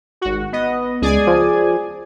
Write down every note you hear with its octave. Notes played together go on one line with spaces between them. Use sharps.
G#1 F#4
B3 D#5
C#2 G#4 D5 G#5
F3